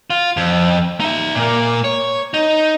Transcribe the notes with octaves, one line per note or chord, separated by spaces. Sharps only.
F4
F2
D#4 E5
A#2 A#3
C#5
D#4